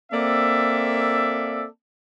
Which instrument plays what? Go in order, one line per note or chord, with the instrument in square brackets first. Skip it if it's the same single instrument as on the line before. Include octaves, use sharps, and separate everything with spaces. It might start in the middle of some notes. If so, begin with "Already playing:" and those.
[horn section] A#3 C4 A4 D5 E5